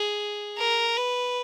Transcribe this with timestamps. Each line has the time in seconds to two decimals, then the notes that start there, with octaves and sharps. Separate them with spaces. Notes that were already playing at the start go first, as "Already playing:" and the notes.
Already playing: G#4
0.58 A#4
0.97 B4